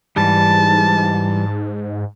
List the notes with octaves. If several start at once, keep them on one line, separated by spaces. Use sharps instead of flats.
G#2 E3 G3 A5